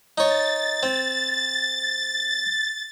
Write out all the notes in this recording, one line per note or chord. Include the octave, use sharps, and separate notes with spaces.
D#4 C#5 A6
C4